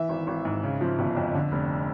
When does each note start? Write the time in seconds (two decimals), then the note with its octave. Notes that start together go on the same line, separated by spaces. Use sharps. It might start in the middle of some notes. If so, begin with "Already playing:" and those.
Already playing: E3 E5
0.09 G#1
0.27 G#1
0.45 G#2
0.63 C#3
0.81 F3
0.99 G1
1.16 F2
1.35 D3
1.52 F1